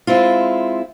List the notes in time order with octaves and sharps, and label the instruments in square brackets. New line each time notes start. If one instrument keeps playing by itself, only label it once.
[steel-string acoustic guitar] G#3 C4 E4 F4